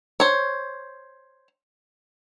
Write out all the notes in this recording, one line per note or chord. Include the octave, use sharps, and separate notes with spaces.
C5 C#5